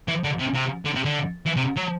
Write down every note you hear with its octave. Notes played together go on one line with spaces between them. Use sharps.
E3
D3
C3
C3
D3
C3
D3
E3
C3
F#3